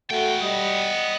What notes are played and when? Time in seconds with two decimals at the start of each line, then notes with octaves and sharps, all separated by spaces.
0.11 A3 B3 F#4 G5
0.42 G3 D#5